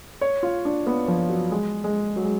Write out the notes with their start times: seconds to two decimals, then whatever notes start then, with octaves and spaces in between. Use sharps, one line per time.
0.21 C#5
0.43 F4
0.65 D4
0.87 B3
1.08 F3
1.30 F#3
1.52 G#3
1.84 G#3
2.16 F#3
2.25 G#3